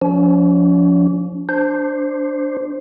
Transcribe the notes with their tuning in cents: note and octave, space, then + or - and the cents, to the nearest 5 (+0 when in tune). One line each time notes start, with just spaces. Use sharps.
F3 +20 C#4 +45
D4 +0 C5 +0